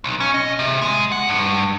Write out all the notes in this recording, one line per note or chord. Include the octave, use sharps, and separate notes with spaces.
B1
C#4
D#5
C3
G#3
F#5
G2